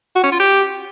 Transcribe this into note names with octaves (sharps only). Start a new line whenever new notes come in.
F#4
C#4
F4
G4